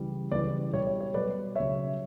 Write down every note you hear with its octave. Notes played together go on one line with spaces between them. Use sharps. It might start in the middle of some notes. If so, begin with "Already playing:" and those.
Already playing: C#3 E3 G3
C#3 E3 G3 B4 D5
B2 G3 C#5
C#5
C#5
B2 G3 B4 D5
C#3 F#3 C#5 E5